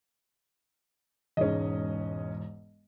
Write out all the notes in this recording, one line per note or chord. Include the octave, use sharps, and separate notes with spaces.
E1 G#2 C#4 G#4 D#5